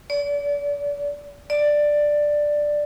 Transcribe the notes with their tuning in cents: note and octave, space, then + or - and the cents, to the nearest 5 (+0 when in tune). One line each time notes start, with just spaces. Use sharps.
D5 -35
D5 +5